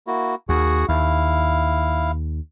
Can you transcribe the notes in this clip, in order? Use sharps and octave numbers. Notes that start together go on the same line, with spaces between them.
A#3 E4 F#4
D#2 F#4 G#4 F#5
D#2 E4 F5